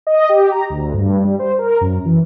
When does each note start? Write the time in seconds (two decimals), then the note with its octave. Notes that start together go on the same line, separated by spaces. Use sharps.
0.07 D#5
0.29 G4
0.52 A#5
0.70 D2
0.93 G2
1.24 G3
1.39 C5
1.59 A#4
1.81 F#2
2.06 E3